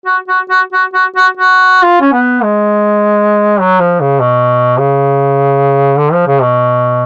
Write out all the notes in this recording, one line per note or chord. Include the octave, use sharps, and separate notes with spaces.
F#4
F#4
F#4
F#4
F#4
F#4
F#4
F4
C#4
B3
G#3
F#3
F3
C#3
B2
C#3
D3
F3
C#3
B2